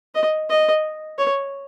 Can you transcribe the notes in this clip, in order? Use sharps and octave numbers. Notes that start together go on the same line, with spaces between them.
D#5
D#5
C#5